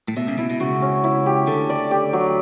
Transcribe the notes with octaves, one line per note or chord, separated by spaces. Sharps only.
A2
B2 E5
C#2 C#3
B2 E4
B2
C#2 C#3 F#4
C#4
E4
G4
D2 D3 A4
D5
G4
F#3